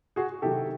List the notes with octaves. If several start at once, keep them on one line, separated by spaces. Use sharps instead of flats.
F#4 G#4
C3 D#3 F#3 G4 A4